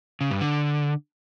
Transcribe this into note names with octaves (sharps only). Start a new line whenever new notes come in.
C#3
G2
D3